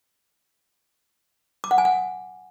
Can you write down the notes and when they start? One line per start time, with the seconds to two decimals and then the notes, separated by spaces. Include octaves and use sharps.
1.64 D6
1.71 F#5
1.78 G#5
1.85 F#5